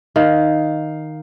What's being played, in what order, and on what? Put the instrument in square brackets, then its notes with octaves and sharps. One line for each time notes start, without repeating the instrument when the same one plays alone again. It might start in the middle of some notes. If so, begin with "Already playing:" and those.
[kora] D#3 [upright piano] F5